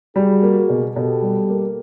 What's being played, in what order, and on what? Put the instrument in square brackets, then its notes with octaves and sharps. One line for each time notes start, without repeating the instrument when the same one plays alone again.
[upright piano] G3 [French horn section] F#4 G#4
[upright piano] A#3
B2
[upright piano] B2 [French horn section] G4 A4
[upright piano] G3
A#3